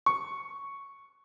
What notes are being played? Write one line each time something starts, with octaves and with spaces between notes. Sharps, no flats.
C#6